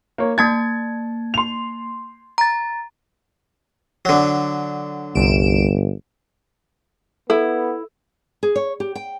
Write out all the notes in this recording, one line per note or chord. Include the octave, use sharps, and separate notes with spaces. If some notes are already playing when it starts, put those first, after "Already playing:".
A#3 C#5
A#3 A5 G#6 A6
C6 F7
A#5 A6
D3 F#3
G1 C2 D7 E7
B3 E4 A4
G#4
C#5
G4
G5